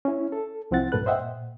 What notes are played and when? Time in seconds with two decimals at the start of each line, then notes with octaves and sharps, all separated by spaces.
0.05 C#4 E4
0.32 A4
0.71 C2 F3 C4 E4 F#5 A6
0.92 G2 A#2 A4 B4 F#6
1.06 C5 D#5 E5 F#5 G5
1.21 A#2